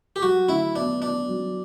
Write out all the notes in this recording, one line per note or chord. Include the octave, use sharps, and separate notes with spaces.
G4
F#3 F#4
D2 E4
B3 D4
B3 D4
F#3